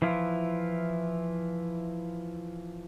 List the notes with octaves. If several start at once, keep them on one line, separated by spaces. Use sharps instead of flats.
E3 F3 E4 F4